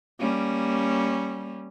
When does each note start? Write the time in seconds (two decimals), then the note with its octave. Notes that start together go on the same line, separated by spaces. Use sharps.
0.19 G3 A#3 C#4